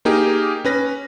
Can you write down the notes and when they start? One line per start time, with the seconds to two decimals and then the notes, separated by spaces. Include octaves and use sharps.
0.05 A#3 D#4 G4 G#4 A#4
0.65 C#4 B4 A#6